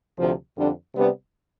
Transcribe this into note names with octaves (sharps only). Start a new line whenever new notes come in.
D2 C3 F3
F2 D3 G3 D4
C3 G3 B3 D4